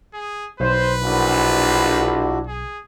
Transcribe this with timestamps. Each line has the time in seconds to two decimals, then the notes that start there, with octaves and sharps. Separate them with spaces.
0.14 G#4
0.60 B1 B4 C5
1.02 A#1 D4 E4 F#4
2.47 G#4